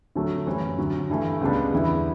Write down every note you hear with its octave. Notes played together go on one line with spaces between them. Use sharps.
D2 D3 F#3 A3
F#2 E3 G3 C#4 E4
D2 D3 F#3
G2 E3 A3
C#2 C#3 G3 B3 D4
E2 D3 G3 B3 E4